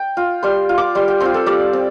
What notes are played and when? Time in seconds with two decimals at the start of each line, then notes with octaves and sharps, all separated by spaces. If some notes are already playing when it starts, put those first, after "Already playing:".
Already playing: G5
0.17 F4
0.43 G3 C6
0.69 F4
0.78 D6
0.95 G3 C6
1.08 G5
1.20 C4 F4 C6
1.34 A4
1.46 G3 D5
1.73 C4